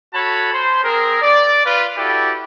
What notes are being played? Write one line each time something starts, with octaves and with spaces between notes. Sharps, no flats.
F#4 A4 C#5 A5 B5
C5
C4 G#4 A#4
D5
F4 B4
E4 F#4 G4 A4 D5